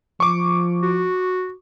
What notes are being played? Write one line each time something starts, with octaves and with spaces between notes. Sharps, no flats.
F3 C#6 D6
F#4